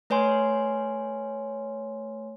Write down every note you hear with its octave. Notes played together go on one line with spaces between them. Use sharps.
A3 B4 C#5 G#5 C6